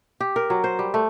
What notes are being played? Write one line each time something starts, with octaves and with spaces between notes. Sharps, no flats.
G4
A#4
F#3
C5
G3
A3